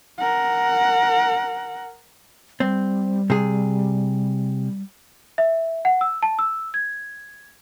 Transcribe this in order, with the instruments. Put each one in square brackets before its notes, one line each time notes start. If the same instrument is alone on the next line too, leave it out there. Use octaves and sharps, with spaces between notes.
[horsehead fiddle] A#4 F#5
[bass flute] G3 [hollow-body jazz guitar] C4
[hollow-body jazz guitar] C3 G#4
[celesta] E5
F#5
E6
A5
E6
G#6